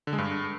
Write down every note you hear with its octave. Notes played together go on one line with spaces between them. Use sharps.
D3
G#3
G2